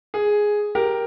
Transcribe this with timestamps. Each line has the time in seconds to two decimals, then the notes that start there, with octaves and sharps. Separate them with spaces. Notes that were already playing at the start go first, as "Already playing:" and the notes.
0.14 G#4
0.75 G4 A#4